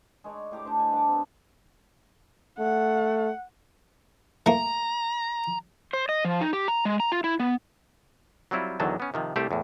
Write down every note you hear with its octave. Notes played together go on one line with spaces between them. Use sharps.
G#3 D#4 C#5 D5
A2 G4 A#5 D6
D4 D#4 C5
G#5
G2 F#5 A5 D6
B3 C4
A3 F#5
A3 A#3 A#5
C5
D#5
F3
D#4
G4
A#5
G#3
A#5
F4
E4
B3
F#3 G3 C4 E4 F4
E2 D3 D#3 F#3 D#5 A5
B3 C#4
C3 D#3 F3
C2 A3 G4 C5 D5
E2 A2